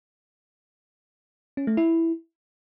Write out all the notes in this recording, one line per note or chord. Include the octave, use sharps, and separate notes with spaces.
C#4
A3
E4